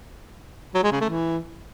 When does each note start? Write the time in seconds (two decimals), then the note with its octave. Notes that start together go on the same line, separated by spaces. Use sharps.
0.74 F#3
0.83 G#3
0.92 C#3
1.00 A3
1.09 E3